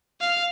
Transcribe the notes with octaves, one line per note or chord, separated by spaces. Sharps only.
F5